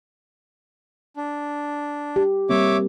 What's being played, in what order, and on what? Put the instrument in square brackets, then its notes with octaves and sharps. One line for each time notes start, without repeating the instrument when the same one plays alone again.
[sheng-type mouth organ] D4
[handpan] G4
[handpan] G3 A#3 C4 [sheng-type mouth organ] C#5 E5 D6